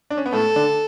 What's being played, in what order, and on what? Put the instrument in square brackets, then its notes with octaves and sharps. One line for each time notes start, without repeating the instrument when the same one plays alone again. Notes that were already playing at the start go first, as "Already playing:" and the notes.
[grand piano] D4
C#4
B3
[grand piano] A2 A3 [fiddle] A4
[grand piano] D3 D4